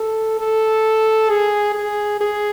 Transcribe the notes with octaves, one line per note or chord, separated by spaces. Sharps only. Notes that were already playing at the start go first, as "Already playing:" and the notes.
Already playing: A4
A4
G#4
G#4
G#4